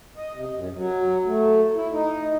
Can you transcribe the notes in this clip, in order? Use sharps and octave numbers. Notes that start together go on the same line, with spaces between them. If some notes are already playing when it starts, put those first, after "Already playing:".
D#5
C3
F#2
F#3
A3
E4
D#4